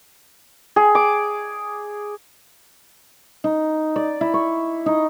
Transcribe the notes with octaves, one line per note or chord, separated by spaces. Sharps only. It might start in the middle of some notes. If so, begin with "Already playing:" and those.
G#4
D6
D#4
D5
E4
C#6
D#4